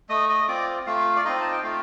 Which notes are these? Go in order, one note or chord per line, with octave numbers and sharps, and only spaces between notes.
A3 D#5 D#6
D#5 D#6
C4 F4 D5 D6
A3 F4 F5
D5
C4 D#4 F4 D#5
A5
G5
A3 F4 F5